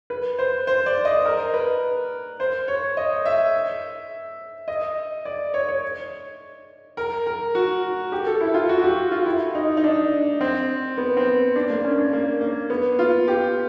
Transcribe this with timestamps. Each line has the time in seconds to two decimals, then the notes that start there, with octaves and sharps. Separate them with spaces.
0.10 B4
0.39 C5
0.67 C5
0.86 D5
1.05 D#5
1.25 A#4
1.54 B4
2.40 C5
2.68 C#5
2.97 D#5
3.26 E5
4.68 D#5
5.25 D5
5.54 C#5
5.68 C#5
6.97 A#4
7.26 A#4
7.55 F#4
8.12 G4
8.27 A4
8.41 E4
8.54 F4
8.69 F#4
8.80 F#4
8.84 G4
9.11 F4
9.26 E4
9.55 D#4
9.77 D#4
9.84 D4
10.41 C4
10.98 B3
11.17 C4
11.56 D4
11.70 A#3
11.84 C#4
11.98 D4
12.13 A#3
12.41 A#3
12.70 B3
12.99 F4
13.28 G4